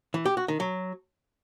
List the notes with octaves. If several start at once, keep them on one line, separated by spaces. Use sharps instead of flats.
E3
G4
F#4
D#3
F#3